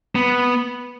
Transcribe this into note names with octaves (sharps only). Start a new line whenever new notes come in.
B3